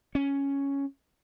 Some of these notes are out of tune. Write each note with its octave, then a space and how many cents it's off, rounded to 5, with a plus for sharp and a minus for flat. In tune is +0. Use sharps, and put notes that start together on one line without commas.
C#4 +0